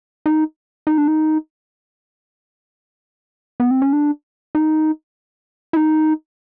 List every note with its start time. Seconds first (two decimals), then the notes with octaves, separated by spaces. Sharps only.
0.26 D#4
0.87 D#4
0.98 D4
1.08 D#4
3.60 B3
3.71 C4
3.82 C#4
3.93 D4
4.55 D#4
5.73 E4
5.77 D#4